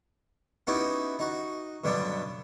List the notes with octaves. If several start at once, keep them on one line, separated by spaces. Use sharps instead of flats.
B3 C#4 D#4 E4 F#4 G4
D#4 F#4
G2 B2 D3 F#3 B3 D4